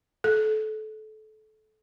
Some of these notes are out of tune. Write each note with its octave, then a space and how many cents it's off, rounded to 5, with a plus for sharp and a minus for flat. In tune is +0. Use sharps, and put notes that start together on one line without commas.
A4 -25